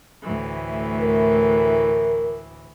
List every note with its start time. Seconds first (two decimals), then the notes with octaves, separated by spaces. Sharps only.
0.23 D2 A2 E3
1.01 A#4